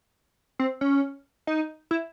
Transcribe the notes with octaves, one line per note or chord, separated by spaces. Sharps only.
C4
C#4
D#4
E4